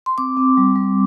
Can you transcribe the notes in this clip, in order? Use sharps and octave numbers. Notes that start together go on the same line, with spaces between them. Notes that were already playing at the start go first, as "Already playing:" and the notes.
C6
C4 D6
C4
G3
G3